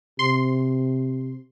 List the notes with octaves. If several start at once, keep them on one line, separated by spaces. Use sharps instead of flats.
C3 C6